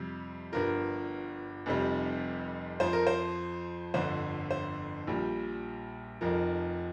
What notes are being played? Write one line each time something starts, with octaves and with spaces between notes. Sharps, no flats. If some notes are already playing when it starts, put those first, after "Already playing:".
Already playing: F2 C3 G3
G1 G2 F3 A#4
F1 F2 C3 G3
F2 F3 C5
A#4
C5
G1 F2 D3 C5
C5
A#1 A#2 G3
F1 F2 F3 A#4